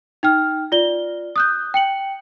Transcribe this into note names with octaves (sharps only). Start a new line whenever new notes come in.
D#4 G5 F6
F4 D5 G7
D#6 F#6 G6
G5 C#7 F#7